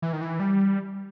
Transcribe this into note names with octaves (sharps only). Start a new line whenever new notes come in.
E3
D#3
E3
G3